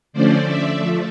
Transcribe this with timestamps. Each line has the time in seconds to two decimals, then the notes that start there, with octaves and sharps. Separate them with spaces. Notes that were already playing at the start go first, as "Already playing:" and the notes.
0.13 D3 F3 A3 C#4 C5 D5
0.46 D5 E5
0.78 F3 A3